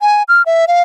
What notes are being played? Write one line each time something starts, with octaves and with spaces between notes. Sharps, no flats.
G#5
F6
E5
F5